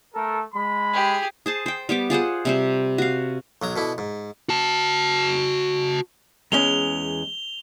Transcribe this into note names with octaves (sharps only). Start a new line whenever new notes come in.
A3 A4 A#4
G#3 B5
G4 G#4
G#4 C5 A5
C5 G5
G3 B3 G5 D6
F4 G#4 C5 F#5
C3 G3 C5
F#4 F5
B1 F#3 A#5
B2 D3 E4
G#2
F#4 A5
E2 G#3 C#4 F7 G7